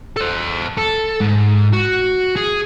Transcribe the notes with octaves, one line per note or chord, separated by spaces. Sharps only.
A4 C5
A4
G#2
F#4
G#4